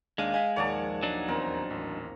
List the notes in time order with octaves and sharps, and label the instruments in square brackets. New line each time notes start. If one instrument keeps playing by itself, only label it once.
[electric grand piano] D#2 D4 D#7 [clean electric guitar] G#3 [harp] F5
[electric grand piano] D#5 F5 [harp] G#5 G#6 B6
[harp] A#1 D#2 [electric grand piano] A#4 F#5 G#5 [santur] C#5 D5 A5
[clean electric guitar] F#3 D4 D#4
[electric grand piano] E2 [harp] C4 [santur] A#4
[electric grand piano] A1